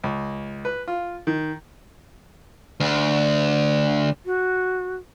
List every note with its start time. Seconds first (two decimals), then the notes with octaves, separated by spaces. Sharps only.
0.04 C#2
0.65 B4
0.88 F4
1.27 D#3
2.80 D2
4.26 F#4